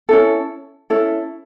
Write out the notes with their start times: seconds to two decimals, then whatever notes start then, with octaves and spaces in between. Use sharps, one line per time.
0.09 C#4 E4 A4
0.90 C#4 E4 A4